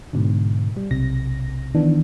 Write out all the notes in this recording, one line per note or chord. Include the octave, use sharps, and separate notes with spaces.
G#2 B2 D3
G3
B1 C3 A#6
D#3 E3 B3 D4